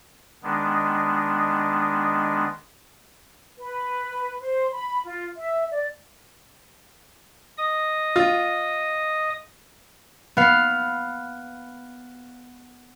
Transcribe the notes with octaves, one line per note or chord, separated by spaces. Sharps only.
D#3 G#3 B3 D4
B4
C5
B5
F4
E5
D5
D#5 D#6
F4
B3 F5